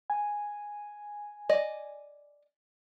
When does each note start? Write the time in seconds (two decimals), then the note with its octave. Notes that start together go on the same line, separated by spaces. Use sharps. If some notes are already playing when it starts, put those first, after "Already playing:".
0.10 G#5
1.49 D5 D#5